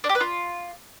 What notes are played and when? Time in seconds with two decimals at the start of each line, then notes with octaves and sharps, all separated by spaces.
0.04 D4
0.09 G4
0.15 B4
0.20 F4